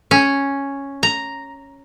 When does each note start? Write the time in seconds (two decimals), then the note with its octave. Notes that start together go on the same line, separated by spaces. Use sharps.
0.11 C#4
1.03 A#5